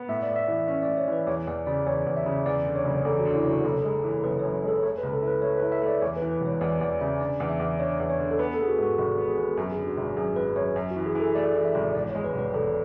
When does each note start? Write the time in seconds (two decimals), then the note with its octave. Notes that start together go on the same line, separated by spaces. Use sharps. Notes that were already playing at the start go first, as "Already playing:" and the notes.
Already playing: B3
0.09 A2 E5
0.23 D5
0.29 A2
0.36 E5
0.48 E3
0.68 C#4 E5
0.83 D5
0.88 A2
0.98 C#5
1.08 E3 B4
1.27 E2 C#5
1.47 E2 D5
1.67 C#3 D5
1.86 E2 C#5
2.06 E2
2.17 E5
2.26 C#3
2.46 E2 D5
2.66 D3
2.75 C#5
2.85 F#1
3.05 E2 A4
3.20 F#4
3.25 D3
3.35 E4
3.45 F#1
3.50 F#4
3.65 F#1 A4
3.84 G#3
4.04 E3
4.24 F#1 B4
4.39 C#5
4.43 F#2
4.63 G#3 A4
4.83 A3 C#5
4.98 B4
5.03 C#2
5.13 A4
5.22 E4
5.27 B4
5.42 A3 C#5
5.58 B4
5.62 E4
5.72 E5
5.82 A3 D5
6.01 E2 C#5
6.17 B4
6.22 E3
6.31 B4
6.41 E1 C#5
6.61 E2 D5
6.81 E2 D5
7.00 C#3 E5
7.20 D4 D5
7.40 E2
7.50 E5
7.60 E2
7.79 D4 C#5
8.00 E2
8.09 C#5
8.19 D3
8.31 A4
8.39 B3 B4
8.54 A4
8.58 B3 G#4
8.68 F#4
8.78 G#2 F#4
8.98 G#1 F#4
9.18 B3
9.28 G#4
9.37 B3
9.57 F#2 F#4
9.72 G#4
9.77 D3
9.87 F#4
9.98 G#1 F#4
10.17 F#2 G#4
10.36 G#1 B4
10.56 F#2 C#5
10.76 F#2
10.91 F#4
10.96 E3
11.06 G#4
11.15 E3 A4
11.35 A3 D5
11.55 E3
11.65 E5
11.75 G#1
11.95 E1 D5
12.09 C#5
12.15 G#3
12.24 B4
12.34 E1
12.39 B4
12.54 E1 A4